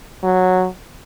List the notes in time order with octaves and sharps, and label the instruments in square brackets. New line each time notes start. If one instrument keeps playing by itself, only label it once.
[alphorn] F#3